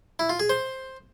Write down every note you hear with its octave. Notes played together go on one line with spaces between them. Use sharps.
E4
F4
G#4
C5